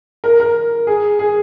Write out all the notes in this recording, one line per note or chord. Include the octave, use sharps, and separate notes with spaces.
A#4
A#4
G#4
G#4